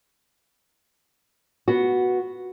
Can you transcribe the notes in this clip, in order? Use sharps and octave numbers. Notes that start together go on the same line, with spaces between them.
B3 F#4